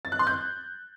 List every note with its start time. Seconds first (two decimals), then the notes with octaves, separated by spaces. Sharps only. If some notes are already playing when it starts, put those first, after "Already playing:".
0.05 A6
0.12 F#6
0.19 C6
0.27 G6